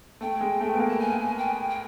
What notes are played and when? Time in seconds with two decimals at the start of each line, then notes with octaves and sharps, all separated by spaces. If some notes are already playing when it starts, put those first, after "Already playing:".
0.21 A3 G5
0.41 G#3
0.61 A3
0.74 B3
0.79 A#3
0.88 A5
0.99 G#5
1.38 G5
1.70 G5